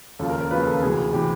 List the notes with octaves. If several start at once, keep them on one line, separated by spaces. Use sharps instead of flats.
D#2 C#3 F3 A4
A#4
A#4
D#2 C#3 F3 B4
A4
D2 C3 E3 G#4
C3 E3 G4